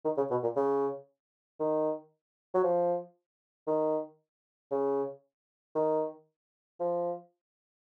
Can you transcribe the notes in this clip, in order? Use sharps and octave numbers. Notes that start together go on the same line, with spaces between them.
D#3
C#3
B2
A#2
C#3
D#3
F#3
F3
D#3
C#3
D#3
F3